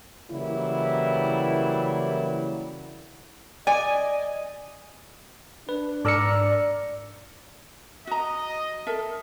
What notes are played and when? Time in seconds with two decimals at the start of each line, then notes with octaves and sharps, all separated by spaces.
0.31 C#3 E3 F#3 G3 A#3 E4
3.67 D5 D#5 G#5
5.69 D4 B4
6.05 G#2 A#4 D5 E6 C#7
8.07 F#4 D#5 A#5
8.87 A4 A#4 E5